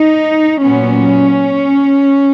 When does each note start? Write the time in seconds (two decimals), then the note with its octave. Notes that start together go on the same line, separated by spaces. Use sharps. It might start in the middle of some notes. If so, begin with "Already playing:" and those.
Already playing: D#4
0.63 A#2 F#3 B3 C#4